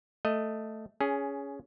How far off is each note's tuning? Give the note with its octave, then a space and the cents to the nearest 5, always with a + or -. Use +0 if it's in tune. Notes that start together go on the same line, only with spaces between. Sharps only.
A3 +5 D#5 +0
C#4 +15 G#4 +0